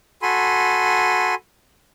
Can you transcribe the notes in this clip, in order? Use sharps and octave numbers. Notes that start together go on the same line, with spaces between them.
F#4 A4 G#5 B5 C6